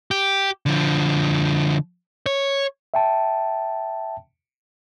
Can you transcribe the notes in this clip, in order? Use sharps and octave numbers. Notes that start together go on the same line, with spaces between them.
G4
D3 F3
C#5
E5 G5 A5